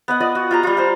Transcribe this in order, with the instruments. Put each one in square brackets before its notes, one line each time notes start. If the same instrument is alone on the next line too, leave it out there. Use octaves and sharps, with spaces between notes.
[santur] B3 D#5 F#5
F4 D5 D#5 D#6
F#4
F4 G4 A#5
G3 F4
C5 F5